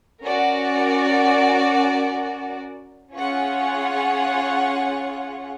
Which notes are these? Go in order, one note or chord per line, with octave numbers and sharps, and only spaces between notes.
C#4 F#4 A#4 D5 F#5
C#4 F4 G#4 C#5 F#5